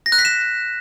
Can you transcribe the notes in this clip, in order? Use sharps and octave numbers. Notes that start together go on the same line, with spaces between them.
A#6
F#6
B6
E7